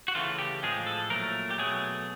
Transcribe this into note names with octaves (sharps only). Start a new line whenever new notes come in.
F#4
C#3 E3 A3 F4
G4
A2 F3 G#3 G#4
A4
A#2 F#3 A3 A#4
G4
B2 F#3 A3 G#4